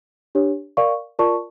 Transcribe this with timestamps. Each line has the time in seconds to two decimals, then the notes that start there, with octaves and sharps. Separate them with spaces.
0.35 D4 G4 C#5
0.77 A#4 D5 F5 C#6
1.19 F4 A#4 D5 A5 C#6